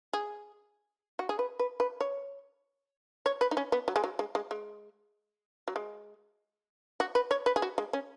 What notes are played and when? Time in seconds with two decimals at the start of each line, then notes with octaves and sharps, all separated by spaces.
0.13 G#4
1.19 F#4
1.29 G#4
1.39 B4
1.59 B4
1.80 B4
2.01 C#5
3.26 C#5
3.41 B4
3.51 D#4
3.57 C#4
3.72 B3
3.88 F#3
3.96 G#3
4.04 F#3
4.19 G#3
4.35 G#3
4.51 G#3
5.68 F#3
5.76 G#3
7.00 F#4
7.15 B4
7.31 C#5
7.46 B4
7.56 G#4
7.62 F#4
7.78 G#3
7.93 C#4